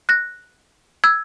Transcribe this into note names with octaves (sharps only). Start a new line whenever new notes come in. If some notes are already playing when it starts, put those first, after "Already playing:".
F#6 A#6
E6 G#6